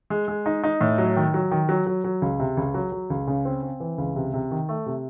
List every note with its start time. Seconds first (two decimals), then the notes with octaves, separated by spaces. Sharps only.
0.10 G#3
0.28 G#3
0.46 D#4
0.63 D#4
0.81 A2
0.98 F#3
1.16 D#3
1.34 F#3
1.51 D#3
1.69 F#3
1.86 F#3
2.04 F#3
2.22 C#2
2.40 C3
2.57 C#2
2.74 F#3
2.92 F#3
3.10 C#2
3.27 C#3
3.45 C4
3.63 C4
3.80 E3
3.98 C#2
4.16 C3
4.34 C3
4.51 D#3
4.69 A3
4.86 C3